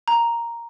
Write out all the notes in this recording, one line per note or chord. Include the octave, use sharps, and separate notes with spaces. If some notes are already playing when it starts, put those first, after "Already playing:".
A#5